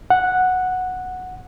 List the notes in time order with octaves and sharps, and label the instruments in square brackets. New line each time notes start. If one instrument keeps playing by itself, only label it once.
[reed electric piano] F#5